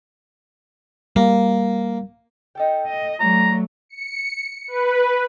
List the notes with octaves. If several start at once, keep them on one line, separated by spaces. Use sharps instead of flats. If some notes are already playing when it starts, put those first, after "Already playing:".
G3 A#3
D#4 A4 G5
D#5
F#3 A3 B3 D4 A#5
C#7
B4